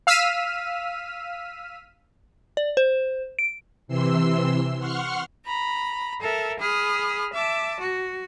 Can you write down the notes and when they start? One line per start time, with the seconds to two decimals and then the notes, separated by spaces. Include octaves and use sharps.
0.07 F5 E6 F6 B6 D#7
2.57 D5
2.77 C5
3.39 D7
3.88 C3 E3 C6 E6
4.79 F#5 C6 C#6 F6
5.44 A#5 B5
6.20 A4 A#4 E5
6.58 G#4 B5 D#6 F6
7.33 E5 A5 D6
7.80 F#4